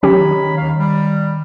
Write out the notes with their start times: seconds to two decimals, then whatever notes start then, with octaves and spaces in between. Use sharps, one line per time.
0.03 D#3 F#3 C#4 G4 C#5 B5
0.57 D#2 F5
0.77 G3